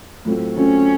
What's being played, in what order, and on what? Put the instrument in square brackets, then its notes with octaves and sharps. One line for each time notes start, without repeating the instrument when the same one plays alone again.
[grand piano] A2 F#3 A3 C4 F4
[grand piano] A2 F#3 A3 C4 F4 [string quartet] C#4